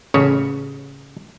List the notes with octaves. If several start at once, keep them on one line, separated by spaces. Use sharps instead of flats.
A1 C#3 C#5